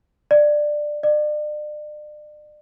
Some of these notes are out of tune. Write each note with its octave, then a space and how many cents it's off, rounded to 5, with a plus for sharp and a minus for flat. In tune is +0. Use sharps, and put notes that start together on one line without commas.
D5 +15
D5 +40